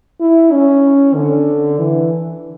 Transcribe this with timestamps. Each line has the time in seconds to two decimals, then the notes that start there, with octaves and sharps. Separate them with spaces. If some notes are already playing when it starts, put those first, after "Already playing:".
0.20 E4
0.52 C#4
1.15 D3
1.78 E3